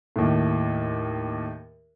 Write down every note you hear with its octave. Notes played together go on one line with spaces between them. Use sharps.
D#2 A2